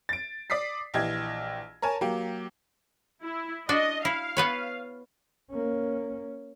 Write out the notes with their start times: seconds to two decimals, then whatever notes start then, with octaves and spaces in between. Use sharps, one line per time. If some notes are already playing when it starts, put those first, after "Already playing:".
0.09 A6 D7
0.50 D5 D6 D#6 B6 C7
0.94 A#1 E3 G4 D#5 G#6
1.82 A#4 C#5 G#5 A5
2.01 F#3 A#3 G4
3.23 E4
3.69 D4 F#4 D#5
4.05 E4 F5
4.37 B3 B4 C#5
5.51 A#3 C#4